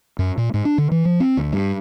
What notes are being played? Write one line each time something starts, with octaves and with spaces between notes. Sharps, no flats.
F#2
A#2
G#2
D4
D3
E3
F3
C4
D2
G2